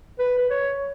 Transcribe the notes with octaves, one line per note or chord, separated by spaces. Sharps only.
B4
B4
C#5